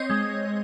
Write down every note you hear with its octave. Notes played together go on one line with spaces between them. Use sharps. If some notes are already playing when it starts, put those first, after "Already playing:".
Already playing: C4 C#5 D#5
G#3